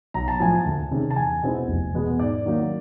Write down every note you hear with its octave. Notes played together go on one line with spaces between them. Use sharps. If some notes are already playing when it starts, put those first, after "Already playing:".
B1 A#5
A5
A2 F3 G#5
A5
D2
C3 D#3 G#3 C#4
A5
E2 G#5
B2 G#3 C4 E4
F1
E2 B2 G#3 B3
G#2 D5
D#3 F#3 A#3 D#4